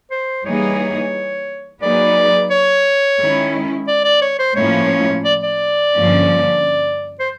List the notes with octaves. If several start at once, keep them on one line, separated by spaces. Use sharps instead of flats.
C5
E3 G3 A#3 D#4 G#4 C#5
F#3 A#3 D#4 G#4 B4 D5
C#5
D#3 G#3 C#4 E4
D5
D5
C#5
C5
A2 F3 A#3 C#4 E4 C#5
D5
D5
G2 D3 F3 A#3 C#4
C5